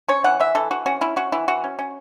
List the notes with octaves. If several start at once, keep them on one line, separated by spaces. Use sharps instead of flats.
C#4 C#5
E3 F#5
E3 E5
E3 A4
E3 F#4
C#4 F#4
C#4 E4
C#4 F#4
E3 E4
E3 F#4
C#4
C#4